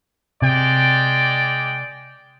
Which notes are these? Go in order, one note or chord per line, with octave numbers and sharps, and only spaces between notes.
C3 G#3 D5 G5